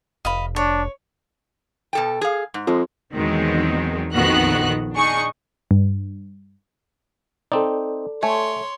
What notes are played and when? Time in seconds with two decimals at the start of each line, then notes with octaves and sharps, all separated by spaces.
0.25 F1 D#5 F5 B5
0.56 D4 C#5
1.93 B2 A4 G5
2.21 G#4 F5
2.54 G#2
2.67 F2 G#3
3.14 E2 B2 D#3 F#3 G#3 C4
4.14 A#1 F2 D#3 B3 F#4 F#6
4.95 D4 D#4 G#4 C#6 C#7
5.71 G2
7.52 C4 D#4 A4 D5
8.23 A3 C#5 G#5 C6